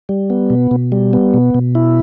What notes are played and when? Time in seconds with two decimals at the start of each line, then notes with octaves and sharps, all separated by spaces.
0.09 G3
0.30 B3
0.50 B2
0.71 B2
0.92 G3
1.13 B3
1.34 B2
1.54 B2
1.75 E4